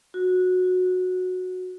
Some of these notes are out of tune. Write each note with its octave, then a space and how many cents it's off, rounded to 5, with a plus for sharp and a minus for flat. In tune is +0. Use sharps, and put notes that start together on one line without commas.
F#4 -15
F#4 -10